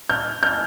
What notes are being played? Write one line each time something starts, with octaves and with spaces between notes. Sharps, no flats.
F6 G6
F6 G6